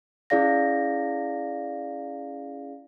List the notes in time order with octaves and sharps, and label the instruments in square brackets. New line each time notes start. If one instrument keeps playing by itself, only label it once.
[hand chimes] C#4 E4 G#4 D5 F5 A#6